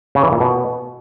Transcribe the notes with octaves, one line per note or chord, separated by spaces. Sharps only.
C#3
E3
A#2
B2